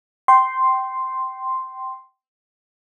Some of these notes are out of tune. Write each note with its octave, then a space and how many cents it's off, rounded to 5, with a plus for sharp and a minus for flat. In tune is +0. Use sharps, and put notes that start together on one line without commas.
G5 -20 C6 +0